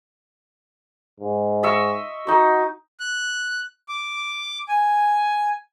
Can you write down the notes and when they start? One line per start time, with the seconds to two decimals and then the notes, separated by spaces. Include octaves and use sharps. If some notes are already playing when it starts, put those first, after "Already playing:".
1.20 G#2
1.63 D#5 E5 C#6
2.27 D#4 F#4 C#6
3.00 F#6
3.88 D6
4.69 G#5